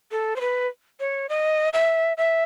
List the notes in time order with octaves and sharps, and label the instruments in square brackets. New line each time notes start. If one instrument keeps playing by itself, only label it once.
[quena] A4
C5
B4
C#5
D#5
E5
E5